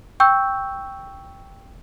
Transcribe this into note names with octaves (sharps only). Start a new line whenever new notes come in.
G5 C#6 E6 G6